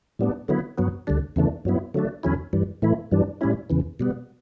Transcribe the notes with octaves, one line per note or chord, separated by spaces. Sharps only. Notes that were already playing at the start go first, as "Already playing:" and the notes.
A2 G3 B3 D4
D3 F#3 B3 E4
G2 F#3 B3
D2 D3 G3 D4
E2 C#3 E3 A3 D4
G2 F#3 B3 E4
D3 F#3 A3 D4
E2 D3 F#3 C#4 E4
G2 E3 G3
A2 E3 A3 E4
G2 E3 G3 D4
A2 G3 C#4 E4
E2 C#3 E3
B2 G3 B3